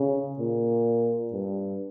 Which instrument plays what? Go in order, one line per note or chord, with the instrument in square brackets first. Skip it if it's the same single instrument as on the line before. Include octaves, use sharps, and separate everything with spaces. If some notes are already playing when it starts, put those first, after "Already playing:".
Already playing: [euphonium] C#3
A#2
G2